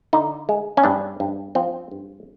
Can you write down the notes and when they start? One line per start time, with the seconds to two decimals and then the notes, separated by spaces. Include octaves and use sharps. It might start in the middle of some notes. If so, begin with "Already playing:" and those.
0.13 D3 D#4
0.49 G#3
0.77 C#4
0.84 G2 D4
1.20 G2
1.55 F3 C4
1.91 G2